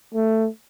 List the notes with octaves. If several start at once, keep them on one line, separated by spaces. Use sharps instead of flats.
A3